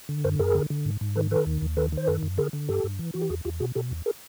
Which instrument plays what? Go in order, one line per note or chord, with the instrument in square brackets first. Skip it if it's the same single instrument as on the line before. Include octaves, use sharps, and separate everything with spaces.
[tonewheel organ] D3
F#2 A#4 C5
F#2 G#4 A#4
D3
D3
G#2
G#2
D#3 A4 B4
D#3 A4 B4
D#2
D#2
D#3 A4 B4
D#3 C5
F#2 A4 B4
F#2
D3 G#4 A#4
D3
G2 G4 A4
G2
E3
E3 F#4
G4
E2 F#4 G#4
E2 F4 G4
B2 F#4 G#4
B2 G4 A4
E2
G#4 A#4